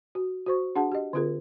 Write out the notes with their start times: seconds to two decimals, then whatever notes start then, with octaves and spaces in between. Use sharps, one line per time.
0.15 F#4
0.46 F#4 C5 C#6
0.76 D4 F#4 G#4 F#5 A5
0.92 G4 D#5
1.13 D3 C4 F4 G#4 A#4